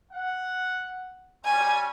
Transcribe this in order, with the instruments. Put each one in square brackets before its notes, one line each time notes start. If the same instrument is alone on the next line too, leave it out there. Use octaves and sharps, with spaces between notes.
[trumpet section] F#5
[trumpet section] G3 C#4 [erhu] G#5